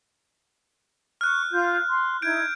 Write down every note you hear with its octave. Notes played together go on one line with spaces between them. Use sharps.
C#6 F6 F#6
F4 G6
C6
D#4 E4 G6 G#6 D7